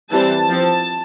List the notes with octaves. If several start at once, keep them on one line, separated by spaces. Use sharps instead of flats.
E3 G3 C4 A5
F3 C4